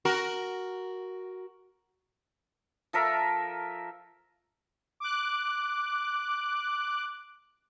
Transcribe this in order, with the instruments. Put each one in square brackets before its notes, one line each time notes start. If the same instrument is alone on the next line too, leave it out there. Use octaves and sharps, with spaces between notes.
[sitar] F#4 A#4
[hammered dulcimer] F3 A4 A#4 E5
[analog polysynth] D6 F#6